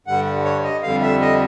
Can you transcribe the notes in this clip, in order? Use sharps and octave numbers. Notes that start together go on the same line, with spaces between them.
G2 D3 G3 F#5
C#5
D#5
F2 D3 G3 F5
E5
D#5